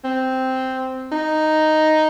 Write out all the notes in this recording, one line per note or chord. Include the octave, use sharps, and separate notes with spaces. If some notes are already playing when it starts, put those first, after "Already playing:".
C4
D#4